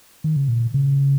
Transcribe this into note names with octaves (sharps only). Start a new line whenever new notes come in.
D#3
C#3
A#2
C#3